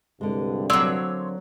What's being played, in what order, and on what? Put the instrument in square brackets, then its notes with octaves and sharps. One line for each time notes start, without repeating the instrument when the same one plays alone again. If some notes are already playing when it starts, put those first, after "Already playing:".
[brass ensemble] C2 G2 [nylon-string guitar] D3 G#3
[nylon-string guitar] D3 A#3 C4 [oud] F#3 D5 [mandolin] C#5 C6 E6